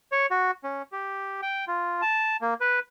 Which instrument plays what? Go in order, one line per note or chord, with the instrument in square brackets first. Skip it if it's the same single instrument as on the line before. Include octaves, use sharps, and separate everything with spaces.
[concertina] C#5
F#4
C#4
G4
G5
F4
A5
A#3
B4